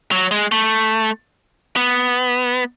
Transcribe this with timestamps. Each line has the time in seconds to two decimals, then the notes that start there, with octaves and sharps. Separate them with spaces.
0.12 F#3
0.31 G#3
0.52 A3
1.76 B3